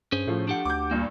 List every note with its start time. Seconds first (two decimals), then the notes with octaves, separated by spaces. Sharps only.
0.12 G2 C#4 G#4 C5
0.27 A2 F3 A3
0.48 D4 G4 F#5
0.65 D2 D6 G6
0.91 G2 A#2 A#3